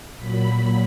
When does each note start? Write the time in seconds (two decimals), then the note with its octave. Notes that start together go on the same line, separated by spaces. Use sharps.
0.18 A#2 F#3 B5